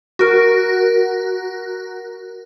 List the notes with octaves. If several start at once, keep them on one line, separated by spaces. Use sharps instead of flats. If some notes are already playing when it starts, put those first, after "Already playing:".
F#4 A#4